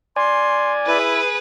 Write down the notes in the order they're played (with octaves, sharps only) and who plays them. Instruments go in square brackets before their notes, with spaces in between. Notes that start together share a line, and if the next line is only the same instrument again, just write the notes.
[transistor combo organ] D5 G#5 [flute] C6
[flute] E4 [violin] G#4 B4